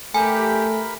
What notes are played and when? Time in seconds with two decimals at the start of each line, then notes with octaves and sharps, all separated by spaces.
0.14 A3 G4 A#4 G#5 B5